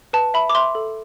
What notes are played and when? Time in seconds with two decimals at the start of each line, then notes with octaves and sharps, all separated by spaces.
0.13 B4 A5
0.34 E5 B5
0.50 D6
0.55 E5 C6
0.75 A4